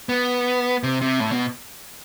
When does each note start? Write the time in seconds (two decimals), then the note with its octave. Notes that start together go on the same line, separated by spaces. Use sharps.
0.09 B3
0.83 C3
1.02 C3
1.20 A2
1.32 B2